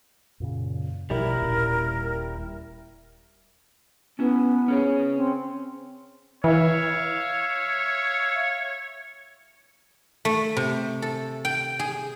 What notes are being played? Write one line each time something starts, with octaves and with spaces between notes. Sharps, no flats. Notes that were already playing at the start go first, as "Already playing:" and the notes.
F#2 A#2 C#3
A#1 B2 F3 G3 E4 A#4
D#1 A#2 C#4
B3 C#4 E4
C#4 G#4 C#5
C4
E3 C#5 E5 F5
A3
C3
A4
G5
G#4